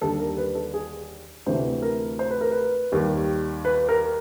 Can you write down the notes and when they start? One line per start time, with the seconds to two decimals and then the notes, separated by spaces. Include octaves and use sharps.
0.01 D#2 D3 G3 A4
0.20 A#4
0.38 B4
0.55 A4
0.74 G#4
1.46 D2 C3 E3 A3 C5
1.82 A#4
2.19 C5
2.31 B4
2.41 A#4
2.51 B4
2.92 D#2 D#3 G3
3.65 B4
3.89 A#4